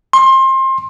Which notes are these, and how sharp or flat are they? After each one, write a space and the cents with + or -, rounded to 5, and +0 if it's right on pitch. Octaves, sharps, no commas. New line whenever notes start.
C6 +25